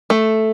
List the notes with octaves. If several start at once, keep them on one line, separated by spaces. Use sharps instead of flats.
A3